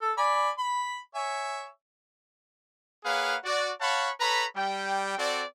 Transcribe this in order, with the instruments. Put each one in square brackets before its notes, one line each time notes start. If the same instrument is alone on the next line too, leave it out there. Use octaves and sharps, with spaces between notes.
[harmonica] A4
D5 G#5 B5
B5
C#5 E5 G#5
[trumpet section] A#3 G#4 B4 C#5 F5 F#5
F#4 D5
C#5 F5 F#5 A5 B5 C#6
A4 B4 C#5 A#5 B5
G3 G5
C4 F#4 A4 D5